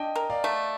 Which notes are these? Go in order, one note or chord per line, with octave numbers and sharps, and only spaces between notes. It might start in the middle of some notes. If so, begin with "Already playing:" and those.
Already playing: D4 D#5 G5
A#4
D5 F5
A3